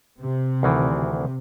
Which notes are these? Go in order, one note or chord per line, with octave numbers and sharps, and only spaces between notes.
C3
D2 D#3 E3